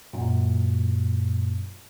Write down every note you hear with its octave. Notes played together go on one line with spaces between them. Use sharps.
F#2 A#2